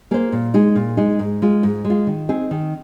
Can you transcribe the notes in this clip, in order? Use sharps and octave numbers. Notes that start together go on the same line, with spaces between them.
A#3 G#4 C5
A#2
G#3 D#4 G#4
A#2
G#3 D#4 G#4
G#2
G#3 F4
G#2
G#3
F4
D#3
C4 D#4 G#4
D#3